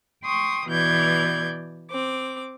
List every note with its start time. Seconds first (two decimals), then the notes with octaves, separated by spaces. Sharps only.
0.24 G5 C6 C#6 D#6
0.68 B2 E3 D5 G6 G#6
1.90 C4 D6